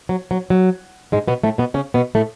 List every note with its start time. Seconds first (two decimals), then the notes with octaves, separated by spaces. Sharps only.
0.09 F#3
0.31 F#3
0.50 F#3
1.12 G#2 G#3
1.27 B2 B3
1.43 A2 A3
1.58 B2 B3
1.74 C#3 C#4
1.94 B2 B3
2.15 A2 A3